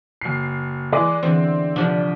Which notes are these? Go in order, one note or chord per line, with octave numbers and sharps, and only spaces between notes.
F#1 C7
E3 G#3 D5
E2 D3 C4
C2 D3 F3 D4